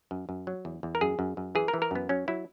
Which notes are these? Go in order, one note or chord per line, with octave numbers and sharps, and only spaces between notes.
F#2
F#2
F#3
E2
E2
A#4
F#2 G#4
F#2
F#2
E3 G#4
A#4
E3
A#4
F#2 B3
F#3 C#4
F#3 E4